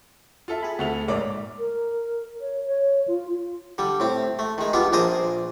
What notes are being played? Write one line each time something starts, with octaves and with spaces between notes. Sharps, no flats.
F4 A4 E5
G#4 G#5 B5
D2 A3 F7
A#1 G#2 A#4 C#5 D5 D6
A#4
C#5
C#5
F4
D3 G3
A2 C4
A3
D#3 G#3
G3 B3 D4 F4
A#1 D4 G#4 A#4 C5 D#6